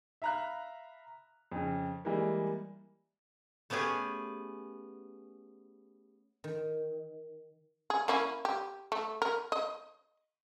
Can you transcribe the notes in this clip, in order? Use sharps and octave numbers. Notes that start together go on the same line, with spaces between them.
E5 F5 A#5 B5 F#6
F2 C#3
E3 G3 G#3 A#3
A3 B3 C#4 G4 G#4
D#3
G#4
A#3 C#4 E4
G4
A3
A#4
D#5